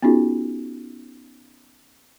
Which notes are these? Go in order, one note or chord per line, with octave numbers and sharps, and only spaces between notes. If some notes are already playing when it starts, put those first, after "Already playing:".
B3 C#4 D#4 F4 F#4 G#4